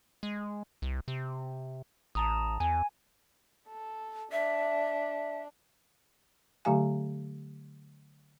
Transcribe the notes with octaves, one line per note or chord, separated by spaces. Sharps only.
G#3
C2
C3
A1 A5 A#5 D#6
E2 G#5
A4
D4 E5
D3 F#3 A3 G4 F5 G#5